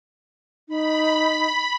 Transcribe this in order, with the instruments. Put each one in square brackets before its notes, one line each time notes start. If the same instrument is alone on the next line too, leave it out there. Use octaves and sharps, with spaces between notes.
[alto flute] D#4 [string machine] B5